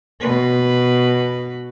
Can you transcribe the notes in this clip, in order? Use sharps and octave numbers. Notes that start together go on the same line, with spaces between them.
B2 B4